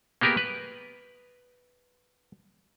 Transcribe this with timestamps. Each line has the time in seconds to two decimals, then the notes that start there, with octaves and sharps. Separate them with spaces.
0.21 A#3 B3 G4 G#4 A#4
0.37 B4